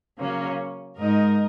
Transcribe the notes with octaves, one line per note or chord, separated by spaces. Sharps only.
C#3 F#3 A#3 C#4
G#2 G#3 D#4 A#4 D#5